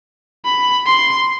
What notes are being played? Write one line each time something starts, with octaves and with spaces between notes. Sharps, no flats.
B5
C6